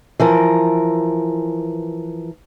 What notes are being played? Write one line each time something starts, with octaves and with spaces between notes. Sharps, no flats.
E3 F3 A#4